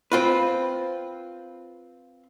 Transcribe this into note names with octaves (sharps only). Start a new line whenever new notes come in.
C4 F4 B4